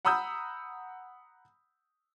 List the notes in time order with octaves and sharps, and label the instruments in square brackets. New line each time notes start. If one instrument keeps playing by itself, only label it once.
[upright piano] F#5 A#5 B5 D#6 E6 G6